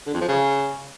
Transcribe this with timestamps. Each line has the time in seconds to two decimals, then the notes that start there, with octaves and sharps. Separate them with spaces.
0.07 D3
0.14 F2
0.21 F3
0.28 C#3